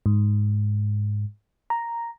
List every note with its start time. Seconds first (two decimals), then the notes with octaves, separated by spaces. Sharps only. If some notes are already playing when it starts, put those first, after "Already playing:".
0.06 G#2
1.70 A#5